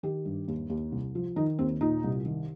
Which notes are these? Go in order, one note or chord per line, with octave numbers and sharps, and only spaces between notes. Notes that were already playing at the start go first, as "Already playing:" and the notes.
D#3 G4
G2
D#2
D#2
C2
F3
D#3 D#4
D#2 C4
A#2 D#4
C2
D#3